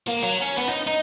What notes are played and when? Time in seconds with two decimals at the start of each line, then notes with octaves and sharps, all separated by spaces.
0.08 A#3
0.23 F#3
0.41 C#4
0.57 B3
0.69 D#4
0.87 D#4